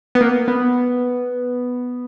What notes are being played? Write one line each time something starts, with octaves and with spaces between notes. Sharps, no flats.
B3
A#3
B3